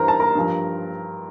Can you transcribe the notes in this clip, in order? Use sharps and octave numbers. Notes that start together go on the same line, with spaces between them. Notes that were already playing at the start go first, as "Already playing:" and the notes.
Already playing: G2 E3 A#4 C5 A#5
A5
A#4 A#5
G2 F3